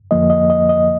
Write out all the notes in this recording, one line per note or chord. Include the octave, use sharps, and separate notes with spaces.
F2 D3 F3 A#3 D#5
D#5
D#5
D#5